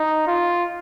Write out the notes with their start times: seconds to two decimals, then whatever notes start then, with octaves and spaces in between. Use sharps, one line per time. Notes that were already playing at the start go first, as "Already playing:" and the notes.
Already playing: D#4
0.27 F4